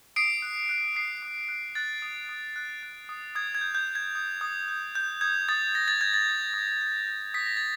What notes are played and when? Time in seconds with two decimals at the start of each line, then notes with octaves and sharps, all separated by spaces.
0.16 D#6 C7 D7
0.42 F#6
0.69 F#6
0.96 D#6 C7
1.23 D#6
1.48 F#6
1.75 F#6 A6
2.02 D#6
2.29 D#6
2.56 F#6
2.83 F#6
3.09 D#6
3.35 D#6 G#6
3.55 G#6
3.61 G6
3.75 G6
3.88 G6
3.95 G#6
4.15 D#6
4.41 D#6
4.68 G6
4.95 G6
5.21 D#6 G#6
5.49 D#6 A6
5.74 G6 A#6
5.88 A6
6.01 G6 G#6
6.14 A6
6.28 D#6
6.54 D#6
6.81 G6
7.07 G6
7.34 D#6 B6
7.46 A#6
7.57 A6